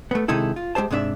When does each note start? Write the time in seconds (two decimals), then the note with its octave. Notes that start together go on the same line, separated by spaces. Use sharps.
0.11 A3 B3
0.28 C3 D#3 G#3 D#4 E4 A4
0.56 F4
0.75 G#3 A3 G4 C5 A5
0.91 G#2 C3 D4 G#4 E5